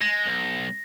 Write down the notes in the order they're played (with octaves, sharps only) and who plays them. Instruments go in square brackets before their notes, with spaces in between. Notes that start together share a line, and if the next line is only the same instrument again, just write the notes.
[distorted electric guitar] G#3 [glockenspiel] A#6
[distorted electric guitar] B1